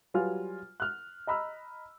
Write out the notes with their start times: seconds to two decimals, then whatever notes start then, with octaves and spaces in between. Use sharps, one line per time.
0.14 F#3 G3 F4 B4 G#5 F6
0.80 F6 F#6
1.27 D#5 A#5 B5 E6 F6